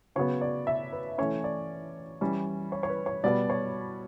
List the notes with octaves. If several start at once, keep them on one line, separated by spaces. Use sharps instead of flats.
C#3 F#3 B3 C#5
D5
E5
B4
E3 A3 C#4 C#5
D5
E3 G3 C#4
C#5
C#5
B4
C#5
B2 G3 B3 D5
C#5